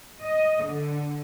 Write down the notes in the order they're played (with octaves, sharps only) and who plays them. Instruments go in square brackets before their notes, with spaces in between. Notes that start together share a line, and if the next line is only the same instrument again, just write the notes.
[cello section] D#5
D3